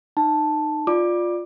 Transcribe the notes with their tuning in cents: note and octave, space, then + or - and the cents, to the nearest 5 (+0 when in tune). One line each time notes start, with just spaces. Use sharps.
D#4 -20 A5 +0
F4 +10 D5 +10 D6 +15